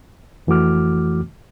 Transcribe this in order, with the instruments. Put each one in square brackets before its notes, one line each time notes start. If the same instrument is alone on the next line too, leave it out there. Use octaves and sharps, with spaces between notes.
[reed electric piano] F2 E3 A3 F#4 D6 F6